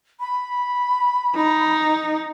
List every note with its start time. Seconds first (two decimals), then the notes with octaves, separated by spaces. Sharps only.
0.20 B5
1.36 D#4